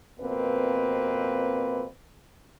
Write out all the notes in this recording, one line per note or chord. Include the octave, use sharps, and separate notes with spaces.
F2 B2 A#3 C4 B4